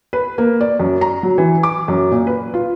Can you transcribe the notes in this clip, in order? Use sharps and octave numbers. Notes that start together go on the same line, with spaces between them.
B4
A#3
D5
F#2
A#5
F#3
E3
D6
F#2
A#2
B4
F4